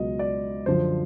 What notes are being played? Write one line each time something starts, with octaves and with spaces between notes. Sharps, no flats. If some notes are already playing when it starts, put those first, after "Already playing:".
Already playing: C#2 B2 F#3 D#5
D5
F#2 D3 F3 C5